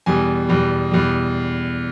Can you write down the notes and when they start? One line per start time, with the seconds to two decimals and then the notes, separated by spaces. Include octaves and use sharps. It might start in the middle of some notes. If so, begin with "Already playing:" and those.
0.06 E2 B2 G3 G#5
0.49 E2 B2 G3
0.91 E2 B2 G3